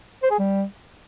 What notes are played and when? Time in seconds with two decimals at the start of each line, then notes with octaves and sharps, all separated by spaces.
0.23 C5
0.31 G#4
0.39 G3